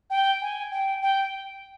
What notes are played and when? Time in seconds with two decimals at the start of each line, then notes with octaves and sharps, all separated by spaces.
0.10 G5
0.41 G#5
0.71 G5
1.02 G5